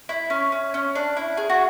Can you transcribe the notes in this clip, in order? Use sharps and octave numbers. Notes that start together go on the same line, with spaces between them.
E4
C#4
C#4
C#4
D4
E4
G#4
F#4